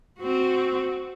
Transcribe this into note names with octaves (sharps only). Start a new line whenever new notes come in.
C4 F#4